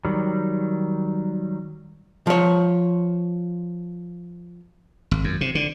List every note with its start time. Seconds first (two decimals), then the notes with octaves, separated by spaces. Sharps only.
0.05 D#3 F#3 G3
2.27 F3 C#5
5.11 G#1
5.24 F#2
5.41 C3
5.55 D3